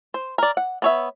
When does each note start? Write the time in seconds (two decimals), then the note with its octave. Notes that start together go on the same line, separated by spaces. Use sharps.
0.14 C5
0.38 A#4 D5
0.57 F#5
0.82 B3 C#5 E5